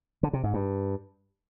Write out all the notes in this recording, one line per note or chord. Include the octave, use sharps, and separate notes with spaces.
D3
C3
G#2
G2